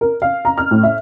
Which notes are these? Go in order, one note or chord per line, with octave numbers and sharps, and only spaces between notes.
A#4
F5
A#5
F6
A2
E5